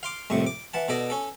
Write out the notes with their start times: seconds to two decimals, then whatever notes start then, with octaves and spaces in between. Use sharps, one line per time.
0.03 F5 C6 D6
0.30 C2 F2 A2 C#6
0.47 D6
0.74 E3 F#5 A5
0.89 B2 A4 D5 D#5
1.10 C#4 A4